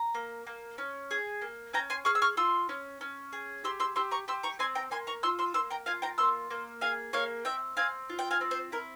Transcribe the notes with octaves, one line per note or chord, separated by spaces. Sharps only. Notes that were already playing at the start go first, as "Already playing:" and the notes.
Already playing: A#5
A#3
A#3
C#4
G#4
A#3
C#4 G5 A#5
G#5 C6
G#4 C#6 F6
E6
C#6 F6
F4 C6 E6
C#4
C#4
G#4
G4 C6 E6
C6 E6
G4 C6 E6
A#5 C#6
G4 C6 E6
A#5 C#6
C4 G#5 C6
G5 A#5
A#3 G#5 C6
A#5 C#6
F4 C6 E6
C6 E6
A#3 C6 E6
G5 A#5
F4 F5 G#5
G5 A#5
A#3 C6 E6
A#3
G#4 F5 G#5
A#3 C#5 F5
C4 E5 G5
C4 F5 G#5
F4
G5
F5 G#5
C4
C5
E4 A#4